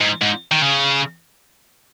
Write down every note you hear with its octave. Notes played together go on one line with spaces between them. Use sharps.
G#2
G#2
D#3
C#3